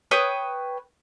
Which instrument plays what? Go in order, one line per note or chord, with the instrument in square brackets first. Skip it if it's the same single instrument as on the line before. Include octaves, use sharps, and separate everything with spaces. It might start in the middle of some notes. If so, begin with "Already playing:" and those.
[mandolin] B4 C#5 G5 D#6